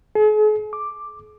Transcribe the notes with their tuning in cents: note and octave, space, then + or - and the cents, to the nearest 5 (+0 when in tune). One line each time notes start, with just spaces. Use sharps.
G#4 +45
D6 +5